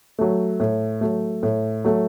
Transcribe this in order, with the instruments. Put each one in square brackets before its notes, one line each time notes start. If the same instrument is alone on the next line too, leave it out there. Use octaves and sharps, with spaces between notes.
[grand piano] F#3 A3
A2
F#3 A3
A2
F#3 A3